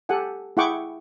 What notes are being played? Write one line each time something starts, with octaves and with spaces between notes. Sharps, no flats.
G4 A4 F#5 G#5
E4 G#4 F#5 G5 C#6 D6